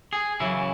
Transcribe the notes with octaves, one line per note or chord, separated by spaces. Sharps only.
G#4
F#2 C#3 E3 E4